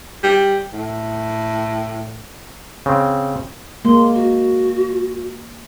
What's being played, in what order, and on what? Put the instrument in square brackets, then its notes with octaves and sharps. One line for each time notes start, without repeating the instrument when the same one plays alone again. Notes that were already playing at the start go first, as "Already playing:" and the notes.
[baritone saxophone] G3
A2
[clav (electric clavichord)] C#3 C4
[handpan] G#3 A#3 [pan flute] C6
[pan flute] F#4